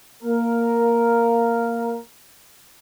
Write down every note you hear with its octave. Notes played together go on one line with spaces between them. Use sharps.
A#3 A#4